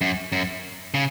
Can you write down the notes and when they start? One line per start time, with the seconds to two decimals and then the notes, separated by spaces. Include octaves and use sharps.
0.01 F#2
0.32 F#2
0.94 C#3